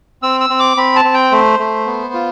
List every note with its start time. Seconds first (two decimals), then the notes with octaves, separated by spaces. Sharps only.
0.23 C4 E6
0.41 E6
0.50 C4
0.59 D6
0.77 C4 B5
0.96 A5
1.05 C4
1.14 G5
1.32 A3 C5
1.59 A3
1.86 B3
2.14 F4